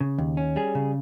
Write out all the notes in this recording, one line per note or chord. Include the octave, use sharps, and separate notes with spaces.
C#3
D#2
C#4
G3 G#4
C#3